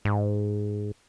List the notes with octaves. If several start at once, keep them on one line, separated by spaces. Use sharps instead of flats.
G#2